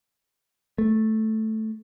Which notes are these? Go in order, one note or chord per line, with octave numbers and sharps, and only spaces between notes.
A3